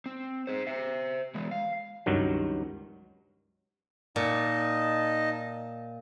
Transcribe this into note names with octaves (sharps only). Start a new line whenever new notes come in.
C4
G#4 C5
C5 E5
E3 G#3
F5
C#2 G2 D#3 F#3
A#2 D#4 D#5 A5